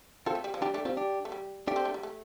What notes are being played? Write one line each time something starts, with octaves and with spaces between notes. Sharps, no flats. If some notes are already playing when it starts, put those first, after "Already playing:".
C4 F4 A4
A3
G3
F3
G3 D4 G4
A3 D4 G4
G3 C4 F4
D4 G4
A3
G3
A3 D4 G4
C4
A3
G3
A3